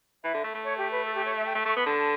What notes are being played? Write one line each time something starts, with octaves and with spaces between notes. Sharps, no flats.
E3 E5
D3
A3
A3
C#5
G4
B4
A4
G4
C#5
E5
G5
A3
A3 C#6
B3 B5
D3 A5